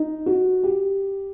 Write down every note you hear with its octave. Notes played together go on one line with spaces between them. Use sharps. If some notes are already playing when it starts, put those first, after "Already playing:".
Already playing: D#4
F#4
G4